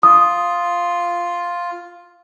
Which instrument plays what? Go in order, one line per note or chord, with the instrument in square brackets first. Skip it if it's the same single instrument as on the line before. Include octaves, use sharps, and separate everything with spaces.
[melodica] F4 [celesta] D#6